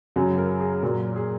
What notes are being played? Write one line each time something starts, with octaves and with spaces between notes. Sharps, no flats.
F#2 C#3 F#3
A#4
G#4
A#2 F#3 A#4
G#4